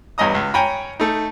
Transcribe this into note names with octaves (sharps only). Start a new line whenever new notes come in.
E2 G2 C#5 D#5 A#5 D#6
C#2
C#5 G5 G#5 A#5 B5
A3 D#4